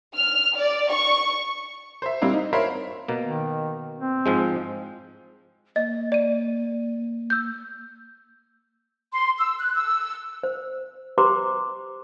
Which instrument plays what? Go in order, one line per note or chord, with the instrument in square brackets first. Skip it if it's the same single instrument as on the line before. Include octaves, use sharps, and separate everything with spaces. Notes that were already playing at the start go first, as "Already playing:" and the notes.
[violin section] F6
D5
C#6
[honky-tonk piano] C5 E5
G3 C4 D4 E4 F5
D#4
A#4 C5 C#5 E5 F5 B5
[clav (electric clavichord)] B2 A#3
[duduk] D#3
C4
[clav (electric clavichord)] G#2 F3 G#3
[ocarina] A#3 [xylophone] D#5
[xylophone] D5 D#7
E6 G6
[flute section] C6
E6
F#6
E6
[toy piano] C5
G4 B4 C5 A#5 C6 D6